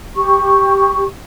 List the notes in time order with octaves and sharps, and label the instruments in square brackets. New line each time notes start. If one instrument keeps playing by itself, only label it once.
[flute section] G4 C#6